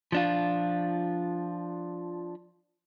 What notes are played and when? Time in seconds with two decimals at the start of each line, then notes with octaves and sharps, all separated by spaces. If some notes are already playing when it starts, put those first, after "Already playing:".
0.12 F3 D4 F4